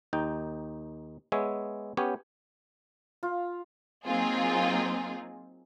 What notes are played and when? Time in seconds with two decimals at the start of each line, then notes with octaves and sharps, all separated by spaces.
0.13 D#2 D#4 G5
1.32 G#3 B3 C#5 E5 G#5
1.97 B3 C#4 G4 C#5
3.23 F4
4.06 F#3 A#3 C4 D#4 F4 G#4